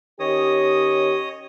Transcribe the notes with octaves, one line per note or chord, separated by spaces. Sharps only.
D#3 C#4 G4 C#5 D#5 D#6